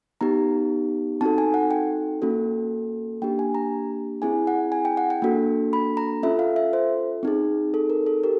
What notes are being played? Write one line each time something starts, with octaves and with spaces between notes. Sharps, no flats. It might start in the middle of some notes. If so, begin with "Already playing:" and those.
B3 D#4 G4 A#5
C4 D#4 F#4 A4 A5
G#5
F#5
G5
A#3 C#4 F#4 A4
A#3 D4 G4 G5
G#5
A#5
C4 E4 G#4 G#5
F#5
G#5
G5
F#5
G5
A#3 D4 F#4 A4
B5
A#5
C#4 F4 A4 E5
F5
E5
C5
C4 D#4 G#4
A4
A#4
A4
G4 A#4